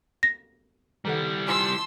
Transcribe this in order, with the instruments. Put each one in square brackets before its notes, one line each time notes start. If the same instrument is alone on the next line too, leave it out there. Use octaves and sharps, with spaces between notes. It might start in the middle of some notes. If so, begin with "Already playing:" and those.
[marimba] A#6
[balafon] D#3 A4 F#5 [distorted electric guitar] G3 E4
[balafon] F4 G#5 [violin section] A5 C6 E6